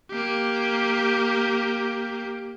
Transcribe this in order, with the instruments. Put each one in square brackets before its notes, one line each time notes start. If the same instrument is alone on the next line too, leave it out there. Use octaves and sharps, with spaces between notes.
[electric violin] A#3 G4